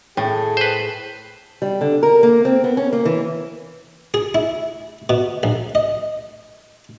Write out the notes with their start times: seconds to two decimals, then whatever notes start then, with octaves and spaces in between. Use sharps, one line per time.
0.17 A2 G#4 A4 G5
0.57 B4 C5
1.62 G3
1.81 D3
2.03 A#4
2.23 A#3
2.45 C4
2.64 B3
2.77 C#4
2.93 A#3
3.06 E3
4.14 G#4
4.35 E4
5.09 B2
5.43 A#1
5.75 D#5